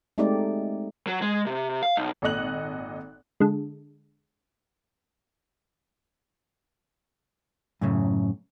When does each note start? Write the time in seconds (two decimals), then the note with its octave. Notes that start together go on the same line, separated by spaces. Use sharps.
0.18 G#3 A3 C4 D#4 G4 D5
1.07 F#3
1.22 G#3
1.46 C3
1.83 F5
1.97 B1
2.22 G#1 A#2 A4 D#5 F#6 F#7
3.40 D3 G#3
7.81 F#2 A2 C#3